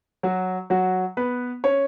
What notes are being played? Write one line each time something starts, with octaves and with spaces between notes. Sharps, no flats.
F#3 F#4
F#3 F#4
B3 B4
C#4 C#5